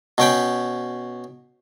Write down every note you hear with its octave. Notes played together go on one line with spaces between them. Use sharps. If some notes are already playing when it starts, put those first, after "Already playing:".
B2 C#4 G5 B5